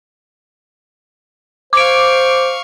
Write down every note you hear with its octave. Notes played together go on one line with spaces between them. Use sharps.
C5 F5 C#6 D6 D7